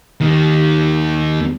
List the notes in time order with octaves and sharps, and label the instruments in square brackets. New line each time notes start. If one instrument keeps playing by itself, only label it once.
[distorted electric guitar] D#2 D#3